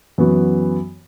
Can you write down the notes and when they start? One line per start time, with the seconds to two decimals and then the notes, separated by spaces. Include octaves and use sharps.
0.18 F#2 E3 B3 F#4